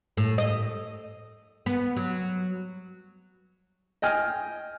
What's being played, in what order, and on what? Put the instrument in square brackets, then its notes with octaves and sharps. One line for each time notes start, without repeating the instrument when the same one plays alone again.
[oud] A2
D#5
B3
F#3
[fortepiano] D#5 G5 G#5 F6